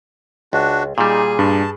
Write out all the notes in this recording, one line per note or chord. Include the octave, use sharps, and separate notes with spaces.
C#2 D4 F#4
A#2 G3 D#4 G#4
G2 A5